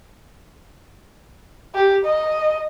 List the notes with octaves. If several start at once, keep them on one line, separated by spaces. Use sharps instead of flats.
G4
D#5